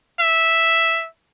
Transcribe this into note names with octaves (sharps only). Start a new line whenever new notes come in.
E5